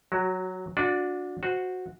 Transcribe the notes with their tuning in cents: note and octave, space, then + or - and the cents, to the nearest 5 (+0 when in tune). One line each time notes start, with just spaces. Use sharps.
F#3 +0 F#4 +25
D4 +0 F#4 -35 D5 +0
F#4 -10 C5 +0